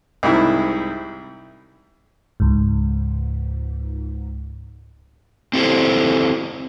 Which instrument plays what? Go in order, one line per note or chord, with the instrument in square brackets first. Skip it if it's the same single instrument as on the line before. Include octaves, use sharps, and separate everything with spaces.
[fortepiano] C2 G#2 E4
[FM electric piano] C#2 G#2
[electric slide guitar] C4 E4 G4 A4 C5